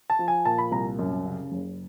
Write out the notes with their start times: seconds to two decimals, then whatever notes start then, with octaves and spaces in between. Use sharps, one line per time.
0.10 A5
0.19 F3
0.28 G#5
0.45 A#2 A5
0.58 B5
0.71 C2 A#5
0.99 F#2
1.24 C#3
1.52 F#1